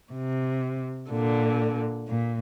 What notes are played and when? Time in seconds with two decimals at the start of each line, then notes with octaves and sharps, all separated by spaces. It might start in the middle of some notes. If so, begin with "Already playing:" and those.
0.12 C3
1.09 A#2 D3
2.08 A#2